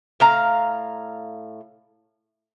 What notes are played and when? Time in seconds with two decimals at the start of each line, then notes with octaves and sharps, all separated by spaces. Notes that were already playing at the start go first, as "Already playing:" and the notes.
0.20 A2 F5 A#5